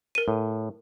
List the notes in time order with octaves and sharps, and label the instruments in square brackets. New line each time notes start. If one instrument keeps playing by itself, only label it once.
[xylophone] A#4 D#7
[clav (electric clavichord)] A2